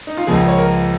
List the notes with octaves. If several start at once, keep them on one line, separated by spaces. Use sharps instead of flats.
D#4
F4
C#2 C#3 F3 A#3 G#4
C#5
A#4